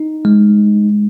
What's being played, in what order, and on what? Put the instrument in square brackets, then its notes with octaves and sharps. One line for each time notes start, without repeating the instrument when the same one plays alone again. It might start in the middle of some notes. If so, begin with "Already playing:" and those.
Already playing: [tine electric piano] D#4
G#3